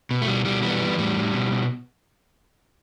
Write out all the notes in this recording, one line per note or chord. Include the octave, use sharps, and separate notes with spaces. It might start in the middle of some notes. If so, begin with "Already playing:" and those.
B2
A3
B2 G3
B2 G3
E3 G3 B3
E3
A2 G3
A2
B2
B2